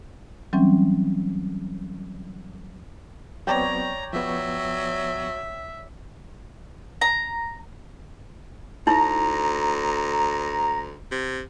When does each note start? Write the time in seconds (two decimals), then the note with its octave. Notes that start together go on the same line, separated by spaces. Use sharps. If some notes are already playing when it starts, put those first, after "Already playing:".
0.53 E3 F#3 G3 C4 C#4
3.47 F#3 B3 C4 C#5 D5 G5 A#5
4.13 F3 F#3 B3 E5
7.01 A#5
8.87 D2 D#4 E4 A#5
11.12 C3